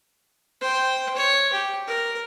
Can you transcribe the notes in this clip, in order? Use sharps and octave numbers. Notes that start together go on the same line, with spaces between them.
C5 G5
C#5
G4
A#4